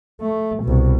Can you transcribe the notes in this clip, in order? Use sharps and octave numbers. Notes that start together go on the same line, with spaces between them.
A3
C2 B2